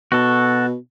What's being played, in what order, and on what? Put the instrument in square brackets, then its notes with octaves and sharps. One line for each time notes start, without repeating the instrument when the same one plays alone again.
[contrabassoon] B2 [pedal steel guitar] F#4 A4